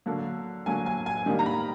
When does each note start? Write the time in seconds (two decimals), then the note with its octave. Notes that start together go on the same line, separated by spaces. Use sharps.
0.06 D3 F#3 A#3
0.66 D3 F#3 A#3 G#5
0.86 G#5
1.06 G#5
1.26 D#3 G3 A#3
1.39 A#5
1.46 B5